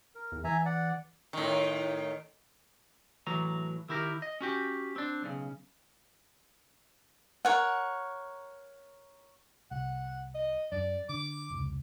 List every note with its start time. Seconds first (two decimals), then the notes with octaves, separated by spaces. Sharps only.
0.15 A#4
0.32 E2
0.44 E3 E5 G#5 A#5
0.65 D5 F#5
1.33 A2 D#3
3.27 A2 E3 F#3 A#5
3.89 D#3 E4 G4 A#4
4.22 D#5
4.41 C#4 F#4 G4
4.96 C4 D4
5.22 B1 C#3
7.45 A#4 C#5 F#5
9.71 C2 F#5
10.34 D#5
10.72 F#2 D5
11.09 D3 D6
11.50 F1 C#2